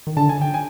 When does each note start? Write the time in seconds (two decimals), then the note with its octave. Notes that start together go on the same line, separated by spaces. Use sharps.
0.07 D#3
0.17 D3 A5
0.29 G#5
0.41 G5
0.54 G#5